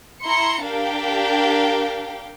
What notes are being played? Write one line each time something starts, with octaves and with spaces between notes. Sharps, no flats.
E4 A#5 C6 C#7
D4 G4 A#4 F5 G5